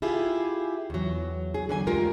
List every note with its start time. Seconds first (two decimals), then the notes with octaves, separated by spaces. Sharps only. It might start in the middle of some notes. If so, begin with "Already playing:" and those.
0.02 E4 F4 G4 G#4
0.90 E2 F#3
1.54 G#4
1.69 D3 F#3 G#5
1.87 D2 G#3 F4 G4 A#4